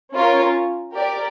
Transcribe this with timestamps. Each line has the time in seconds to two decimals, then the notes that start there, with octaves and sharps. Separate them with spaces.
0.13 C#4 F4 A#4 C#5
0.93 G4 A#4 D5